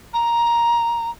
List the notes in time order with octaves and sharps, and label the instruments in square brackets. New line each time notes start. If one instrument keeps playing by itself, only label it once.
[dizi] A#5